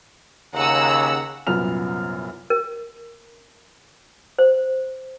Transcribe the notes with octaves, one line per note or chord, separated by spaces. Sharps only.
D#2 C#3 F#5 A#5 E6
C2 F#2 A#2 B3 F6 F7
A#4
C5